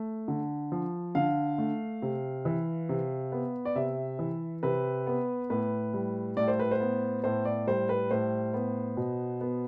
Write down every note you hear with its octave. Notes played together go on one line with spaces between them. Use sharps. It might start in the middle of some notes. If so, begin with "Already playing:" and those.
Already playing: A3
D3
F3
D3 F5
A3
C3
E3
C3
B3
D5
C3 E5
E3
C3 B4
B3
A2 B4
G3
A2 D5
C5
B4
C5
B3
A2 C5
D5
G3 C5
B4
A2 C5
B3
B2
B3